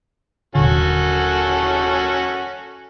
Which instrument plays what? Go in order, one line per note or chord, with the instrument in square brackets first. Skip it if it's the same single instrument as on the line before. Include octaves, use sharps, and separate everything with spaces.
[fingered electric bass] D#1 A#2 D3 [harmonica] C#4 F#4 A4